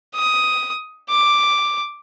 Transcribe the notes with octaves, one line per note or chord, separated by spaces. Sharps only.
D#6
D6